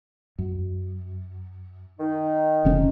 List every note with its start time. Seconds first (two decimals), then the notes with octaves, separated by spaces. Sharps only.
0.39 F#2
2.00 D#3 D#4
2.65 F1 D3 C#4